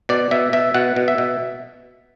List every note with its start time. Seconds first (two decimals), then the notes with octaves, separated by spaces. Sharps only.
0.09 B2 D5
0.31 B2 E5
0.53 B2 E5
0.74 B2 F#5
0.96 B2
1.08 E5
1.18 B2